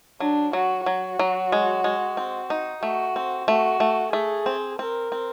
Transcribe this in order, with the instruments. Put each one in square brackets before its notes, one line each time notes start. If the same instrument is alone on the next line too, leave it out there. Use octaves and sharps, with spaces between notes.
[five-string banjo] F#3 [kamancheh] D4
[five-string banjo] F#3 [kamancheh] F#4
[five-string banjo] F#3 [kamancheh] F#4
[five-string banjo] F#3
G#3
G#3
C4
D#4
[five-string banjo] A3 [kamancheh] F#4
[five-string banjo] C4
[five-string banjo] A3 [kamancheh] F#4
[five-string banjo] A3
[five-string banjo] A3 [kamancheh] G#4
[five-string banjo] C4
[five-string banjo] C4 [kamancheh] A#4
[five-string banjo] C4